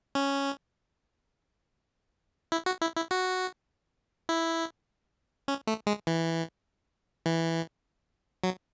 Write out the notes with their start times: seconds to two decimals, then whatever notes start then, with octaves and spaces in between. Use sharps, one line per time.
0.15 C#4
2.52 E4
2.66 F#4
2.82 E4
2.96 E4
3.11 F#4
4.29 E4
5.48 C#4
5.67 A3
5.87 G#3
6.07 E3
7.26 E3
8.44 F#3